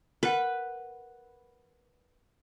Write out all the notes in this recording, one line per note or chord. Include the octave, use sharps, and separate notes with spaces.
A#4 B4 F#5